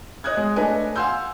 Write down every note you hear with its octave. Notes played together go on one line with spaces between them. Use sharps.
C#5 D#5 D#6 F#6 G#6
G#3
A3 D4 B4 C#5 D#5 G#5
F5 F#5 G#5 C6 E6 G6